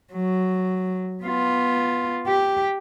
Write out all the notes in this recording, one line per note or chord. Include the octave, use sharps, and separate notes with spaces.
F#3
B3 F4
G4